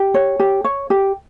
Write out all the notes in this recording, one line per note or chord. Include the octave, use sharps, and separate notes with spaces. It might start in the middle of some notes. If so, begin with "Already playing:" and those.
Already playing: G4
C#5
G4
C#5
G4